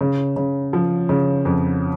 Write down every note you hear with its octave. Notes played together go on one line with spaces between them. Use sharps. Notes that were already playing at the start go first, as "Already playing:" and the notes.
C#3
C#3
F3
C#3
F2